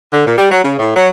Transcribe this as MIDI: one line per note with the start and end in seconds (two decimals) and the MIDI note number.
0.13 0.24 50
0.26 0.36 46
0.38 0.49 55
0.51 0.62 54
0.64 0.73 49
0.78 0.92 45
0.96 1.08 54